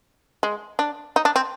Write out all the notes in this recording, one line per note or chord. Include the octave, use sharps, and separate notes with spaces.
G#3
D4
D#4
D4
C4